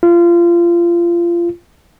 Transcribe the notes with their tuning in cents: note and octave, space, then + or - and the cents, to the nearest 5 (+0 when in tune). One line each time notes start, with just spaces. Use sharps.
F4 -25